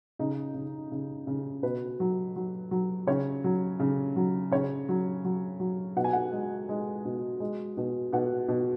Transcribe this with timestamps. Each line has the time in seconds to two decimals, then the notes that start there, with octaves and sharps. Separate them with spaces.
0.19 C#3 D#4
0.54 C#3
0.91 C#3
1.27 C#3
1.63 B2 B4
2.00 F#3
2.36 F#3
2.71 F#3
3.07 C#3 C#5
3.44 F#3
3.80 C#3
4.16 F#3
4.51 C#3 C#5
4.89 F#3
5.24 F#3
5.60 F#3
5.96 B2 F#5
6.04 G#5
6.13 F#5
6.32 G#3
6.69 G#3
7.05 B2
7.40 G#3
7.77 B2
8.13 B2 F#5
8.48 B2